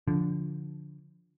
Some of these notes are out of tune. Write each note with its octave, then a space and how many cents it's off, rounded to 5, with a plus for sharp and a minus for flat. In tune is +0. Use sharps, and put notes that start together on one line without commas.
D3 -20 F3 +0